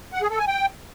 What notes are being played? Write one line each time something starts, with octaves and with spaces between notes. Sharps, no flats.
F#5
G#4
A4
G#5
G5